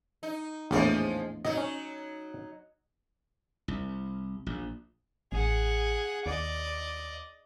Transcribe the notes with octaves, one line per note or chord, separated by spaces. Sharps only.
D#4
A#1 E2 A2 F3 G#3 C#4
F#3 D#4 D#5
C#4
C2
A#1
A1 G#4 F#5
D#2 D5 D#5